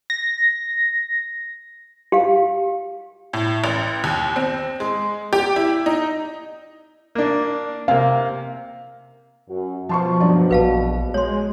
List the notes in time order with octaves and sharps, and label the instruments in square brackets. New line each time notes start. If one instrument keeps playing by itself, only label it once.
[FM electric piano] A#6
[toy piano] G4 F5
[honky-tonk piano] A2
A1
D#2
C4
G#3
G4
E4
D#4
[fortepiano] A#3 D4
[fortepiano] C3 A#3 [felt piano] F5
[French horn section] F#2 F#4
[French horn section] B2 [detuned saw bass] F3 [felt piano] A5 C6 C#6
[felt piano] G2 F#3 D5
[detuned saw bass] A#1 [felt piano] F#4 [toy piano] B4 F5 A5
[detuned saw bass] G#3 [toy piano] C#5 C6